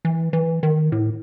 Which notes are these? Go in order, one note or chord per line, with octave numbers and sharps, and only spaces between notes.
E3
E3
D#3
A2